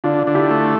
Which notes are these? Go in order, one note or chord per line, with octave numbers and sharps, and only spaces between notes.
D3 D4 F4
D3
E4 G4
A3